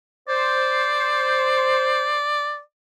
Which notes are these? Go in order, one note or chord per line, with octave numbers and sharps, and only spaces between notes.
C5 D5